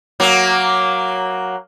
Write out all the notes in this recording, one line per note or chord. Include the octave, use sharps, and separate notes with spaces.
F#3 A#3